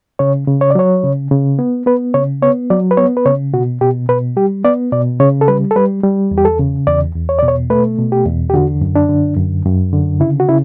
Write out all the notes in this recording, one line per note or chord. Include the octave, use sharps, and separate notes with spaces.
C#3 C#5
C#3
C#5
D5
F#3 C#5
C#3
C#3
B3
B3 B4
C#3 C#5
B3 C#5
F#3 D5
B4
B3 C#5
B4
C#3 C#5
B2 F#4
B2 G4
B2 B4
G3 G4
B3 D5
B2 D5
C#3 C#5
A4
G3 B4
A4
G3 B4
G3
E2
G4
A4
C#3
E2 D5
E2
C#5
B2 D5
C#5
A3 B4
B2
G4
E2
G4
D3 F#4
F#2
D4
D3
F#2
F#2
D3
C#3 E4
F#4
C#3 E4